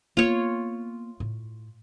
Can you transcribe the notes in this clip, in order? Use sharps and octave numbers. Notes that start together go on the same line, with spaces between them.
A#3 B3 F4 C#5
A2